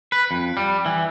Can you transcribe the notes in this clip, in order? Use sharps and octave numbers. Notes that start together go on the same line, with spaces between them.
B4
F2
G3
E3